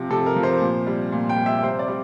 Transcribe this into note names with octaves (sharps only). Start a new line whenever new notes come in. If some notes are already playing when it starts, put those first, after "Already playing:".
Already playing: C3 F3 G5
C3 A4
A#4
F3
C5
A#2
G3
A#2
G5
G3
E5
C3 C5
D5
G3